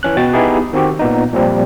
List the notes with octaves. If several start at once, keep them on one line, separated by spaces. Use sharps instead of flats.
E3 C#4 F#6
B2 F#4 G5 A6
B3 D#4 E4 G4 G#4
D#3 C4 F#4 G4
A#2 B3 D#4
A#2 F3 G3 C4